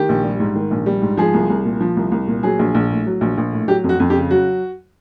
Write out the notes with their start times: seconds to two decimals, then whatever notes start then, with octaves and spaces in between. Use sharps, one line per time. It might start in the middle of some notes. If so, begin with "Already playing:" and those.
Already playing: D#3 G4
0.09 A#1
0.24 G3
0.40 G#2
0.55 D#3
0.71 A#1
0.86 G3
1.02 G#2
1.17 F3 G#4
1.34 C2
1.50 C2
1.65 A#2
1.81 F3
1.97 C2
2.12 C2
2.27 A#2
2.43 F#3 G#4
2.59 A#1
2.74 A#1
2.90 A2
3.06 F#3
3.21 A#1
3.37 A#1
3.52 A2
3.68 F#3 G4
3.84 F2
3.89 F#4
4.00 F2
4.10 G4
4.15 C#3
4.31 F#3 F#4